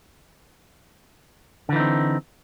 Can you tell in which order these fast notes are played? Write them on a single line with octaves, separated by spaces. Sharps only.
D3 E3 D#4 C4